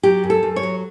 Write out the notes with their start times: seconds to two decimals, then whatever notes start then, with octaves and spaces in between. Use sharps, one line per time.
0.03 F#3 G4
0.23 F#2
0.30 A4
0.43 F#2
0.56 C#5
0.63 F#3